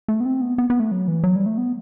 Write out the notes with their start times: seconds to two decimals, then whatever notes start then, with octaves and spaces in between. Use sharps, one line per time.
0.08 A3
0.20 B3
0.26 C4
0.41 B3
0.58 B3
0.70 B3
0.80 A3
0.92 F#3
1.08 E3
1.23 F#3
1.36 G3
1.46 A3
1.58 B3